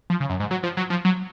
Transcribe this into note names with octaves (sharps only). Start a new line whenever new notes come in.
F3
C#3
F#2
G#2
F#3
F3
F#3
F3
F#3